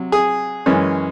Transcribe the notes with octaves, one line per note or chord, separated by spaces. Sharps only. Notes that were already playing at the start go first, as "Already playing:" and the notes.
Already playing: C3 F#3
G#4
F#2 E3 G#3 C#4